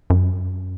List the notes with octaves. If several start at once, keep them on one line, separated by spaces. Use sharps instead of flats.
F#2